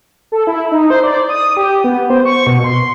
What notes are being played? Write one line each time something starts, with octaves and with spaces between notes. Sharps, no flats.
A4
E4
D#4
C5
D5
D#6
G4
B3
C5
C#6
B2
C6